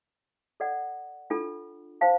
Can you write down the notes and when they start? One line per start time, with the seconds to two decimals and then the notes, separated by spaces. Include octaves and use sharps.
0.60 A4 D5 F#5
1.30 D4 F4 A4
2.01 C5 F5 A5